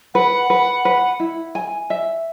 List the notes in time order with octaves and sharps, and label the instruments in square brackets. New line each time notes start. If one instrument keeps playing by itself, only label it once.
[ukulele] B4 [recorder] F#5
[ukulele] B4
B4
E4
G#5
E5